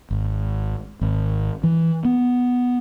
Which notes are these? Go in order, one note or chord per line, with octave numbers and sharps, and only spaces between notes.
G#1
G#1
E3
B3